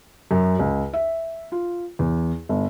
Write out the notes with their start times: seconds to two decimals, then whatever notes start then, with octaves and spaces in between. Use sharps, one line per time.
0.31 F#2
0.59 C#2
0.94 E5
1.52 F4
1.99 E2
2.49 G1